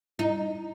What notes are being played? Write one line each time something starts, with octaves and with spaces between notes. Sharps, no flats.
D#4 E4